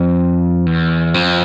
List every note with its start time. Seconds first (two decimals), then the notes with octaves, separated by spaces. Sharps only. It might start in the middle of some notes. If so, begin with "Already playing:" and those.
Already playing: F2
0.66 E2
1.14 F2